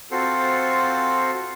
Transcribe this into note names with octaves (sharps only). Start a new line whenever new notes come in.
C4 F4 F#4 A4 C5